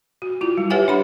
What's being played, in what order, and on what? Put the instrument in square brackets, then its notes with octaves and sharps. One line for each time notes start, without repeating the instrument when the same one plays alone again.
[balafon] F#4
E4 F4
G3
G4 B4 C#5 E5 F#5 G#5
D4 F#5 B5